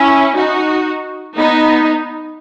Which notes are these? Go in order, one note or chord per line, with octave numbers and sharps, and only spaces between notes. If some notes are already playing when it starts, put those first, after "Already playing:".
Already playing: C#4 E4
D#4 F#4
B3 D#4